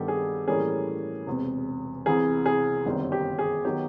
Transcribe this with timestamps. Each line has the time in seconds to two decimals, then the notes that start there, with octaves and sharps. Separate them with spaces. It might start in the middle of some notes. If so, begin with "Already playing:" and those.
Already playing: G2 D#3 G3 B3 G4 A4
0.08 G#4
0.48 A2 E3 G3 A#3 C#4 G#4
1.27 E1 E2 C3
2.06 C2 C3 E3 G#4
2.46 G#4
2.86 G1 F#2 D#3 G3 C4
3.12 G4
3.39 G#4
3.65 D#3 F#3 B3 G4